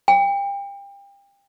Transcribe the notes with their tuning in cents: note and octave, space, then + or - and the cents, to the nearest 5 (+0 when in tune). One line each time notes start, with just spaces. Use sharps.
G5 +30